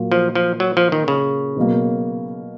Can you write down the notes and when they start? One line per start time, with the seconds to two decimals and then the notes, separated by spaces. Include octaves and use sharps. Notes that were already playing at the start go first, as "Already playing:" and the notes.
Already playing: A#2 F#3 A#3 F4
0.12 F3
0.35 F3
0.60 F#3
0.77 F3
0.92 D#3
1.08 C#3
1.56 B2 F#3 A#3